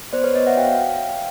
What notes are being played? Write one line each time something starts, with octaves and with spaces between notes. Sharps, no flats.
B3 C5 D5
B4 C#5
B3 C#5 D#5
E5 F#5
F#4 F5 G5